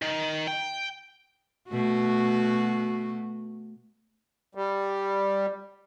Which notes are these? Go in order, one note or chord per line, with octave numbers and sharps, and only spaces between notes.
D#3
G5
B2 A3 F#4
G3